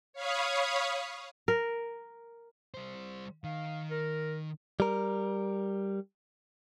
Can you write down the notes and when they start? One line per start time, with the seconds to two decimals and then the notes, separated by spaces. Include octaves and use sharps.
0.13 C#5 F5 B5 C#6 D#6
1.48 A#4
2.74 G3 C5
3.44 D#3 F5
3.91 A#4
4.80 G3 A#4